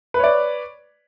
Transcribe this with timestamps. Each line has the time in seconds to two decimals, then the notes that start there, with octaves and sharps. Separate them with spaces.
0.14 B4
0.19 C#5
0.24 D5